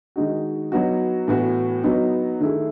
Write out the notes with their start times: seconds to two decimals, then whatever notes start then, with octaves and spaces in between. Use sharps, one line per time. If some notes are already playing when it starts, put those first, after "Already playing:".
0.16 D#3 G#3 D#4 F#4
0.72 F#3 B3 D#4 F#4
1.28 A2 E3 B3 F#4
1.84 F#3 B3 D#4 F#4
2.40 D#3 A3 E4 G#4